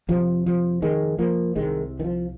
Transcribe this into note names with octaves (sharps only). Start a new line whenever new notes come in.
F2 C3 F3
F3
D#3 G#3
F3 A#3
C2 C3 D#3 G#3
D#3
F3